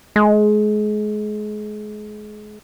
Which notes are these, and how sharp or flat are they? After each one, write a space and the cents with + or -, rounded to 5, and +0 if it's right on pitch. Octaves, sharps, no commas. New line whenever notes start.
G#3 +30